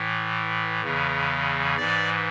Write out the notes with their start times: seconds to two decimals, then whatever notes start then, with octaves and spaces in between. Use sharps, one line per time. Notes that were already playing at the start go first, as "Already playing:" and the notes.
Already playing: A2 E3
0.84 E2 C#3 E3
1.77 G#2 E3 D5